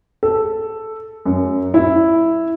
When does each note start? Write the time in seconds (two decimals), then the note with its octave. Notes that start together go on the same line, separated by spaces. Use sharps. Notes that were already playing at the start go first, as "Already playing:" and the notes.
0.23 A4
1.26 F#2
1.74 E4